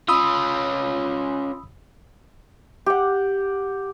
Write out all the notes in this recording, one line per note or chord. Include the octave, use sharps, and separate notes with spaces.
C#4 F4 B5 D#6 E6
G4 F#5